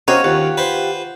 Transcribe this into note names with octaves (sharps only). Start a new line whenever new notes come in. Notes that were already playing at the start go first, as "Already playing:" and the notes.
C#4 D#4 F#4 G4 C5 C#5 F5
D#2 F4 G4 F#5
B4 C5